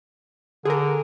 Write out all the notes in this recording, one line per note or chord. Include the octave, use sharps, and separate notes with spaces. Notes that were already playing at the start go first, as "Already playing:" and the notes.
D3 G#4 A#4